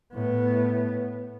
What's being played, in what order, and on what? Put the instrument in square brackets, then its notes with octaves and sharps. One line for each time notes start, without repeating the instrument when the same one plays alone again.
[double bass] A2 B3